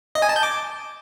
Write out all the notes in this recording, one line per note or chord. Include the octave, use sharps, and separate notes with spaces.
D#5
G#5
A5
G6
D6